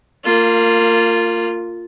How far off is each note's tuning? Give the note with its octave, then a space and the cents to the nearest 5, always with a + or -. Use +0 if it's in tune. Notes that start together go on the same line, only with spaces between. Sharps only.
A#3 -25 F4 +0